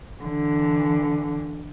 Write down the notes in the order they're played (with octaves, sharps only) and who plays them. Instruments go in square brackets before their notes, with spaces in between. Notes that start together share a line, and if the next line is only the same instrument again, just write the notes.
[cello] D3 E3